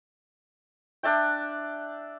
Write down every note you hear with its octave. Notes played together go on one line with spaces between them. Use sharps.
D4 D5 E5 G5